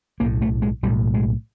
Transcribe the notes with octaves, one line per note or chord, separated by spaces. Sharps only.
B1 A2 A#3
A3
G#3
B1 A2 G3
G#3